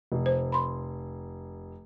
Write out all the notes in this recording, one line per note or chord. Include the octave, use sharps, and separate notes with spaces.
F1
C5
B5 C6